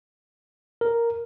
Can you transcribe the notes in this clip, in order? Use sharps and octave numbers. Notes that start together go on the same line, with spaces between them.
A#4